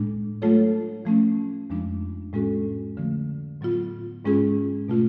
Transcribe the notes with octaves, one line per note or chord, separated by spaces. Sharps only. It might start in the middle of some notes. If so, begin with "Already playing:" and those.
Already playing: A2 G#3 D4
F#3 A3 F4 A4 C#5
F3 A3 C#4
F2 F3 G#3 D4
A2 G#3 C#4 F#4 A4
D3 F3 A3
A2 F#3 B3 F4
G#2 G#3 C#4 F4 G#4
B2 A3 F4